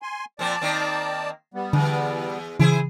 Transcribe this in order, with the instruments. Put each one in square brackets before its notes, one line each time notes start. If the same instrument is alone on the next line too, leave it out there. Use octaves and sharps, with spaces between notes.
[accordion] G#5 C6
[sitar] A#2 F3 C4 [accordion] D5 A5
[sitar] D#3 A#3 C4
[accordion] G3 B3
[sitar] E2 [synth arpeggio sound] D3
[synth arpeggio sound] C#3 E3 [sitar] E4 G#4 C5